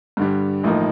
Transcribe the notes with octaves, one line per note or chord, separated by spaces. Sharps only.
G2 D3 G3
A1 A2 F3 A#3 D#4